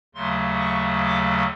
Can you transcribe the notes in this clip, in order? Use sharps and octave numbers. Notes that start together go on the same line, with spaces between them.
D#2 C#3 F#3 A3 C6
C#6
D6